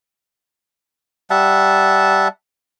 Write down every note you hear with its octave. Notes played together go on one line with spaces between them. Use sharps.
G3 E5 F#5 A5